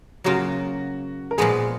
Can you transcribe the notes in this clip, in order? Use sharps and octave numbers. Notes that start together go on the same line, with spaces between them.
C#3 F#3 A#3 F4 F#4
A#4
A#2 F3 G#3 B3 F#4 G#4